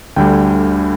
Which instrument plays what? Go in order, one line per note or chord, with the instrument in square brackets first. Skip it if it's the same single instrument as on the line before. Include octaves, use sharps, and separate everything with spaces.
[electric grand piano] D2 D3 G3 G5